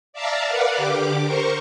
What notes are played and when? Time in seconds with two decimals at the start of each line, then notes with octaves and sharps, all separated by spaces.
0.13 D5 E5 F5 A5 A#5
0.46 A#4 B4 D5 F5 F#5
0.76 D3 G4 D6
1.24 A#4 C5 C#6